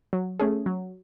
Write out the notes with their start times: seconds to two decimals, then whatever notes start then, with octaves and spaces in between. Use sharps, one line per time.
0.13 F#3
0.39 A3 C#4 G#4
0.66 F#3